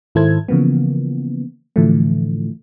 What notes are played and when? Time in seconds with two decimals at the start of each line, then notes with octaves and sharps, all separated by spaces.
0.15 G#2 D#3 E4 A4 C5 G#6
0.48 C#3 E3 F3 A#3 B3
1.76 A2 D3 E3 F3 A3